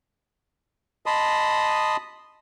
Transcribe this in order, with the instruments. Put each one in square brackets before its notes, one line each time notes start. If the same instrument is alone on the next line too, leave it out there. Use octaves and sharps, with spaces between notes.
[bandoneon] D#5 A5 B5 C6 D#6